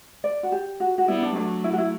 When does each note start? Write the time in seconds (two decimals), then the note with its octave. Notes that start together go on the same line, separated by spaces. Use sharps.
0.24 D5
0.43 F#4
0.52 G4
0.80 F#4
0.98 F#4
1.08 G3 B3 E4
1.22 D4
1.35 F#3 A3 D4
1.64 E4
1.73 F#4
1.78 E4